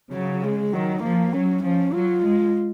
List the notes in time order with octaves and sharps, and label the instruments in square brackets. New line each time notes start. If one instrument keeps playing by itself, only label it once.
[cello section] C#3 [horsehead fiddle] F#3
[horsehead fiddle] G#3
[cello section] D#3 [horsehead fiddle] F#3
[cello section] F3 [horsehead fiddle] A#3
[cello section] F#3 [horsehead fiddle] C#4
[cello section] F3 [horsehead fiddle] C#4
[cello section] F#3 [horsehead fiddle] F4
[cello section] G#3